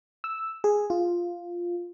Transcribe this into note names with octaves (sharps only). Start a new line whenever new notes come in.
E6
G#4
F4